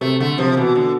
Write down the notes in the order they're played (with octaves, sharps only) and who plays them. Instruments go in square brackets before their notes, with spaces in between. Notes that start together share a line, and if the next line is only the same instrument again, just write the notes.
[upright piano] C3 [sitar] A3
[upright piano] D3 [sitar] A3
[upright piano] C3 [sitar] F3
[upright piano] B2 [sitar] E3
[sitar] D3